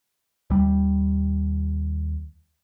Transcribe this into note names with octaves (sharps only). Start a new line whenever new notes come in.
D#2 G3